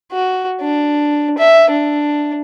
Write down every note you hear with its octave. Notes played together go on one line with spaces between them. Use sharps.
F#4
D4
E5
D4